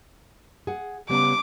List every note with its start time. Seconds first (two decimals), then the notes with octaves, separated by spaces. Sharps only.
0.67 G#4 F#5
1.09 C#3 G3 B3 D6